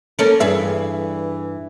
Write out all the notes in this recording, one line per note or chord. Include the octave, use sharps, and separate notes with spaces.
A#3 C#4 A4
G2 E3 G#4 E5